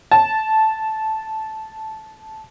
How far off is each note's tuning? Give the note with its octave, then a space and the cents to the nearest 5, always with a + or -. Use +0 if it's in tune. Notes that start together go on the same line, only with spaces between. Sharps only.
A5 -10